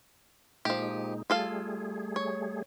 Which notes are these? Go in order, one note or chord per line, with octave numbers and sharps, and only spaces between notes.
A#2 F3 G#3 D#4 G4
G3 A3 F4 G#4 A4 F5
C#5